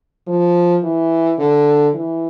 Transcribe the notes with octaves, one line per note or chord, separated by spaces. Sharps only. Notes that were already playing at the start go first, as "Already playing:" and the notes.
F3
E3
D3
E3